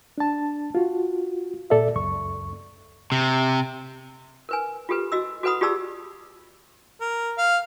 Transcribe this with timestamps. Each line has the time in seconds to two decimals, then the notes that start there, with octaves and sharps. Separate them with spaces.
0.18 D4 A5
0.75 F4 F#4
1.70 A#2 A4 D5 E5
1.96 C#2 F#2 C#6
3.12 C3
4.49 A#4 B4 G#5
4.89 F4 G4 A4 B4
5.12 F#4 D#5 E6
5.43 F#4 A4 B4 F#5 B5 D#6
5.61 F4 G4 G#4 D5 A5 E6
7.01 A#4
7.38 F5